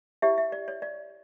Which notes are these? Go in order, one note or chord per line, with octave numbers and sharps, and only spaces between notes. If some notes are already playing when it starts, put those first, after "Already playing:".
E4 G4 C#5 E5
E5
D5
C#5
D5